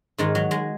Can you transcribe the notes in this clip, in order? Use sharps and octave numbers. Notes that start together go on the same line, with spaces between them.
G#2 D#3 G#3
F#3
G#3